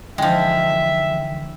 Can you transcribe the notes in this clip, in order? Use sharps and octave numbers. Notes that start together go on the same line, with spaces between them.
D3 E3 F3 G#3 E5 G5